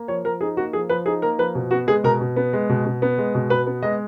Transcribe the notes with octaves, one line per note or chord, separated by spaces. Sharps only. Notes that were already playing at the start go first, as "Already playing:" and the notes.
Already playing: A#3
F3 C#5
F3 A#4
D#4 G#4
A#3 F#4
F3 G#4
F3 B4
D#4 G#4
A#3 A#4
F3 B4
B2
B3 F#4
G#3 G#4
B2 A#4
B2
B3
G#3
B2
B2
B3
G#3
B2
B2 B4
B3
G#3 D#5